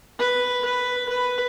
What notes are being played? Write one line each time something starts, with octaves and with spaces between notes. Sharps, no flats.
B4
B4
B4